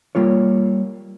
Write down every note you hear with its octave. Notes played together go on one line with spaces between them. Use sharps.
G3 A#3 F4 C#5